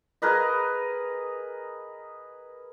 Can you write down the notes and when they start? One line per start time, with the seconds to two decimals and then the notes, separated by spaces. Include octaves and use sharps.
0.22 G#4 A#4 B4 D#5